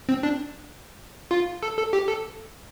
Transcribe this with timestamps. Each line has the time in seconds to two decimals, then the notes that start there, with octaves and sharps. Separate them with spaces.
0.09 C4
0.23 D4
1.31 F4
1.63 A4
1.78 A4
1.93 G4
2.08 A4